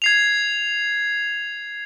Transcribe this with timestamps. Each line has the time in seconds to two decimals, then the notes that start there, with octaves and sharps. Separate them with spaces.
0.02 G#6 C7 F7